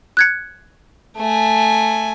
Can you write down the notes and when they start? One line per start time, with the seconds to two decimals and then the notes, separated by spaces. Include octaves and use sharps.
0.17 F#6 G#6 C#7
1.18 A3 G#5